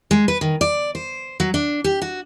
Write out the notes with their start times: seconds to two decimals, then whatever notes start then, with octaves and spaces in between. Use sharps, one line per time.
0.11 G#3
0.28 B4
0.41 D#3
0.61 D5
0.95 C5
1.40 F#3
1.54 D4
1.84 G4
2.02 F#4